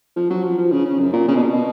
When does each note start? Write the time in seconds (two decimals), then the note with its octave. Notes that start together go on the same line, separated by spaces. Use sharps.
0.16 F3
0.30 F#3
0.43 F3
0.58 F3
0.72 C#3
0.85 C#3
0.99 F#2
1.13 A#2
1.28 C#3
1.35 B2
1.43 A#2
1.50 B2